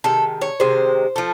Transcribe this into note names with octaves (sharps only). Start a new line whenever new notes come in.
C3 D#3 G#3 A4
C#5
C3 D#3 G#3 C5
F3 A3